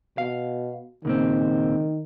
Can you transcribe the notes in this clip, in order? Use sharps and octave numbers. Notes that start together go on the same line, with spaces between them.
B2 F5
C#2 A#2 D#3 C4